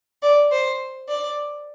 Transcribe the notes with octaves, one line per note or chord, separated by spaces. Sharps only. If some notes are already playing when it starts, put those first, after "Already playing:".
D5
C5
D5